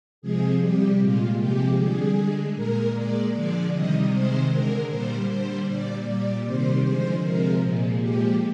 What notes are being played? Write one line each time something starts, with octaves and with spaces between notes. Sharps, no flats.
C3 F3 G#3 G#4
C3 G3 G4
A#2 G#3 F4
C3 F3 G#3 G4
D3 G3 G#4
D3 G#3
A#2 G#3 A#4
A#2 G#3 D5
D3 F3 G#3 D5
C3 D#3 G3 D#5
C3 D#3 G#3 C5
D3 G#3 A#4
A#2 G3 C5
D3 G3 C5
A#2 G3 D5
A#2 G3 D5
C3 D#3 G3 C5
D3 F3 G#3 C5
C3 F3 G#3 A#4
A#2 F3 G#3
A#2 F3 G#3 G4